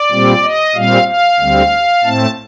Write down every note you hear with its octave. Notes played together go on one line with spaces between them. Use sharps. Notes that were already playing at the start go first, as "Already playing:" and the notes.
Already playing: D5
A#2 G3 C4
D#5
A#2 G3 C4 F5
F5
D2 D3 G3 C4
A2 A3 C4 A5